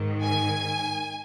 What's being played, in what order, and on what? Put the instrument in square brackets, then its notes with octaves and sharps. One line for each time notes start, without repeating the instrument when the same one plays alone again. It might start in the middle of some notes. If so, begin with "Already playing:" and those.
Already playing: [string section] G#2 D#3
G#5